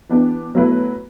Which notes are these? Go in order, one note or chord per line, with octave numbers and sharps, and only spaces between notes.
E3 B3 D4 G4
B2 F#3 A3 E4 B4